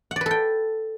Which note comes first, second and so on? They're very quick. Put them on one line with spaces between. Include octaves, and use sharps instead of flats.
F#5 D5 B4 A4 G5